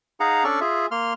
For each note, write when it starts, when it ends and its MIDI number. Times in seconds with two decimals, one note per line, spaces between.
0.20 0.44 63
0.20 0.44 68
0.20 0.44 77
0.20 0.44 78
0.20 0.44 82
0.44 0.60 61
0.44 0.60 62
0.44 0.60 69
0.44 0.60 74
0.44 0.60 85
0.61 0.86 65
0.61 0.86 68
0.61 0.86 76
0.91 1.13 58
0.91 1.13 84
0.91 1.13 89